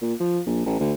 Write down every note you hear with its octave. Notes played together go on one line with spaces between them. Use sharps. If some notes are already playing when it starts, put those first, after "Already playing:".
A#2
F3
A#1
A1
D2